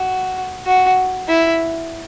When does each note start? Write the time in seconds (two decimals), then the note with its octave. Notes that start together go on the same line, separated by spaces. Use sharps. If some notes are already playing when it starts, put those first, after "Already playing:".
Already playing: F#4
0.67 F#4
1.28 E4